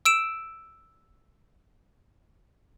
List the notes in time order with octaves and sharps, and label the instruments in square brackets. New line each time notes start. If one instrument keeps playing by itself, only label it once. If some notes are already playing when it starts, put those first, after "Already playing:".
[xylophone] E6 D7 E7